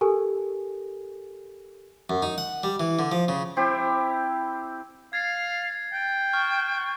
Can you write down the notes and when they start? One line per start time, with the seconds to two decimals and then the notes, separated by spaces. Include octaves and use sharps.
0.01 G4 A4 A#4 G#5
2.10 F#2
2.22 D#4
2.38 F#5
2.63 G3
2.80 E3
2.99 D3
3.12 F3
3.28 C#3
3.57 C4 E4 G4 C5
5.13 F5 G#6 A6 C7
5.92 G5
6.33 C#6 F6